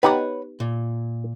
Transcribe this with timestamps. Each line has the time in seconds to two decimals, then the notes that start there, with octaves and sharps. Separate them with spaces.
0.03 B3 D#4 G4 B4 C#5 F#5
0.60 A#2